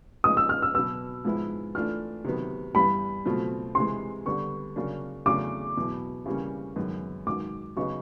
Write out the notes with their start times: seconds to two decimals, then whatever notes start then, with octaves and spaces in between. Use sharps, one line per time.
0.24 A#2 F3 G#3 B3 D#4 D#6
0.37 E6
0.49 F6
0.62 E6
0.74 B2 F#3 B3 E6
1.25 G#2 F3 G#3 B3 E4
1.75 E3 A3 D4 F4 F6
2.24 C3 D#3 F#3 B3
2.75 G2 E3 G3 B3 B5
3.25 B2 F#3 A3 C4 F4
3.75 C3 E3 G#3 C6
4.26 D3 G3 B3 C#6
4.76 C#3 F#3 A#3 D4
5.26 E2 C#3 F#3 A3 D4 D6
5.77 E2 B2 F#3 B3 E4
6.26 C#3 E3 G3 A#3 C#4
6.76 F#2 D#3 G#3 B3
7.27 G#2 D#3 F#3 D6
7.77 C#3 F#3 B3 D#4 C#6